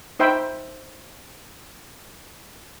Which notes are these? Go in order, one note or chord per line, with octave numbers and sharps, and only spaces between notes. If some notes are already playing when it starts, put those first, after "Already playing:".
D#4 C5 E5 G5 B5